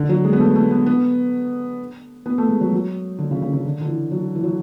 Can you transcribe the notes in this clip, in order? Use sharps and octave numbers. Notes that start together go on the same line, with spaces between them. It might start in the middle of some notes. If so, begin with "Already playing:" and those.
Already playing: D3
F#3
G#3
B3
A3
A3
B3
B3
B3
A3
G#3
F#3
F#3
D3
C#3
C#3
C#3
D3
D3
E3
F#3
E3
F#3